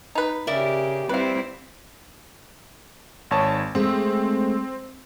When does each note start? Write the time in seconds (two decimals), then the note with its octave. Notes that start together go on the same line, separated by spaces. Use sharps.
0.15 D#4 B4
0.47 C#3 G4 A#4 D5 E5
1.09 G3 C4 E4 B4 F5
3.31 G#1 C#5 A5
3.75 G#3 A3 C4